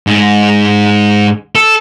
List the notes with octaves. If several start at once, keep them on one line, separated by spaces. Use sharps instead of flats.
G#2
A4